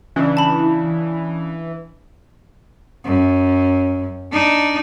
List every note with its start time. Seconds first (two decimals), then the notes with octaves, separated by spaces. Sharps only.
0.16 C#3 E3 D4
0.37 A5 B5
3.05 F#2
4.32 D4 D#4